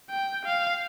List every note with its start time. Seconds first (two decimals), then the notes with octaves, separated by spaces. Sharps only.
0.11 G5
0.45 F5